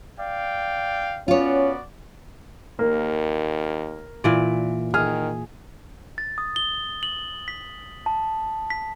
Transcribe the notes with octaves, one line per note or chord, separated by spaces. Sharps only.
D5 F5 G5
B3 C#4 F4 F#4 C#5 D5
D#2 A#3
A#2 E3 D5
D#3 G#4 F6
A6
D#6
G7
F#7
B6
A5
B6